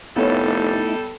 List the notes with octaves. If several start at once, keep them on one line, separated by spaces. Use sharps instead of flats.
F1 G3 A3 B3 D#4 E4 A4 C#5